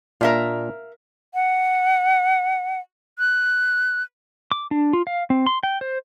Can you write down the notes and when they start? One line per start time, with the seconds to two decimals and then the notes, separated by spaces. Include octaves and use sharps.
0.21 A#2 D4 A#4 E5 F5
1.34 F#5
3.19 F#6
4.52 D6
4.71 D4
4.93 F4
5.07 F5
5.30 C4
5.46 C6
5.63 G5
5.81 C5